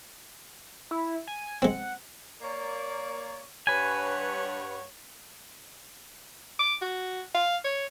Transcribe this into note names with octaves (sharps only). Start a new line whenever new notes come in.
E4
G#5
G#3 C4 F#5
A#3 C#5 D5
G2 B4 C#5 F#5 G#5
D6
F#4
F5
C#5